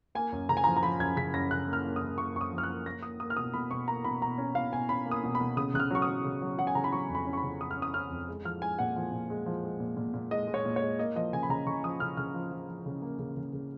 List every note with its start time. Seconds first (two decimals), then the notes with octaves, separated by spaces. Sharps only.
0.15 A#3 G#5
0.32 F#2
0.49 C#3 A#5
0.57 G#5
0.64 F3 A#5
0.77 A#5
0.83 F3 B5
1.00 F#2 G#6
1.16 C#3 B6
1.33 F#2 A#6
1.51 C#3 F#6
1.68 A#3
1.73 F6
1.84 A#3
1.96 D#6
2.02 F#2
2.18 A#3 C#6
2.35 F#2 C#6
2.41 D#6
2.52 F3
2.58 F6
2.63 F#6
2.69 A#3
2.86 A#3 A#6
3.02 A#3 D#6
3.20 A#3 D#6
3.30 F6
3.37 B2 D#6
3.54 B2 B5
3.71 B2 C#6
3.87 A#3 A#5
4.04 B2 B5
4.21 B2 A#5
4.38 C#4
4.55 B2 F5
4.72 B2 G#5
4.89 C#4 B5
5.06 A#3
5.11 D#6
5.24 B2
5.35 B5
5.41 B2
5.57 C#3 D#6
5.74 C#3 F#6
5.80 F6
5.91 F#3 C#6
6.02 D#6
6.08 F#3
6.24 C#3
6.42 F#3
6.58 F#3 F#5
6.67 G#5
6.75 C#3 A#5
6.84 B5
6.93 F#3 C#6
7.09 F2
7.15 B5
7.27 C#4
7.33 C#6
7.37 B5
7.43 C#3
7.61 F2 D#6
7.71 F6
7.77 C#4
7.82 D#6
7.94 C#4 F6
8.10 F2
8.28 G#3
8.44 F3 F6
8.61 G#3 G#5
8.79 A#2 F#5
8.96 F3
9.12 A#2
9.30 G#3
9.46 F3
9.64 G#3
9.80 A#2
9.97 A#2
10.14 A#2
10.31 G#3 D#5
10.47 G#3
10.54 C#5
10.65 A#2
10.76 C#5
10.82 G#3
10.99 A#3 D#5
11.16 F3 D#5
11.33 C#3 G#5
11.43 B5
11.49 C#3 A#5
11.66 C#3 C#6
11.83 F3 D#6
12.00 C#3 F6
12.17 C#3 F6
12.34 F3
12.51 F3
12.68 F3
12.86 C#3
13.02 A#3
13.19 C#3
13.36 C#3
13.53 C#3